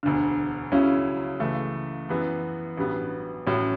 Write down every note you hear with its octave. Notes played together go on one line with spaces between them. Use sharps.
E1 D2 D3
C#2 C#3 F#3 C#4 E4
C#2 C#3 E3 A3
F#2 E3 B3
A1 G2 F#3 B3
A1 A2 F#3 C#4